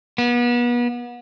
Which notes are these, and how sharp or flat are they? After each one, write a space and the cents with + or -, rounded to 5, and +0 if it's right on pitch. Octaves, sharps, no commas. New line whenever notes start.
B3 -35